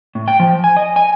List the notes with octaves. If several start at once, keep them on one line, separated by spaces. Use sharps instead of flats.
A2
G5
F3
G#5
D#5
G#5